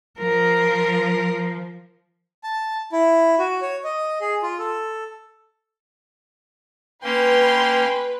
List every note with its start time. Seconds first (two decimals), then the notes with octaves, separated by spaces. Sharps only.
0.19 F3 A#4
2.44 A5
2.92 E4
3.39 F#4
3.62 C#5
3.84 D#5
4.21 G#4
4.43 F4
4.59 A4
7.04 A#3 C#4 B4 G5 C6